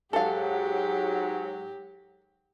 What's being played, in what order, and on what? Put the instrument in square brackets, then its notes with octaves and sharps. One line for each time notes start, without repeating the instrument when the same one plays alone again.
[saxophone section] G#2 F#3 [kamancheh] G4 [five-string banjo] A4 F5